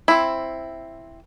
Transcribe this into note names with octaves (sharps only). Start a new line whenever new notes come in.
C4 E4